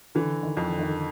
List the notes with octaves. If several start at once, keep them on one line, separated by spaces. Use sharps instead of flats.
D3 E3
D#3
F2
D3
D#3
D3